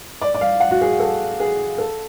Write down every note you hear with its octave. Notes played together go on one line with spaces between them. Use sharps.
D5
D5
F5
F#5
F#4
G#4
A4
G#4
A4